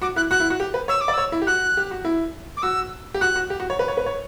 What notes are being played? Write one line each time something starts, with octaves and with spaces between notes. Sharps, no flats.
F#4 D6
E4 F#6
F#4 F#6
E4
F#4
G4
B4
C#5 E6
D6
D5
C#5 E6
E4
G4
F#4 F#6
G4
F#4
E4
D6
F#4 E6
G4
F#4 F#6
F#4
G4
F#4
C#5
B4
C#5
B4
C#5